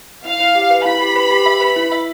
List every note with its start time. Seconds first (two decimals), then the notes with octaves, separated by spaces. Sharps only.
0.25 E4 F5
0.40 E4
0.55 G4
0.70 B4
0.86 E4 B5
1.01 G4
1.16 B4
1.31 G4
1.46 E5
1.61 B4
1.76 E4
1.92 E5